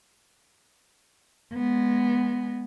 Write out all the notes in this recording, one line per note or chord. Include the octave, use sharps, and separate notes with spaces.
G#3 B3